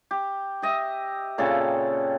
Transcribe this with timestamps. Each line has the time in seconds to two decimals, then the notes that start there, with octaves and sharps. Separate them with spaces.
0.11 G4
0.62 G4 D#5 E5
1.38 A#2 C#3 C4 A4